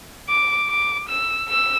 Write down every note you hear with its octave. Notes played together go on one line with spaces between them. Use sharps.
D6
D6
E6
E6